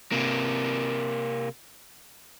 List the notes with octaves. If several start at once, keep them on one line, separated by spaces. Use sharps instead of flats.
C3 A#3